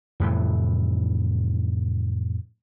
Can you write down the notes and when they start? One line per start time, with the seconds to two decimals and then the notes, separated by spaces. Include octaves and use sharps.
0.20 F2 A2 C3 E3